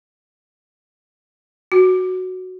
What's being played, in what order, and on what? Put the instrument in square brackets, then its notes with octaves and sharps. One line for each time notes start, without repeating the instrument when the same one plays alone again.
[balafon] F#4